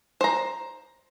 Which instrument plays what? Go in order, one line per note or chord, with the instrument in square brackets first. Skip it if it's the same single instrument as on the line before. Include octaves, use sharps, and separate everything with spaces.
[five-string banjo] C5 A#5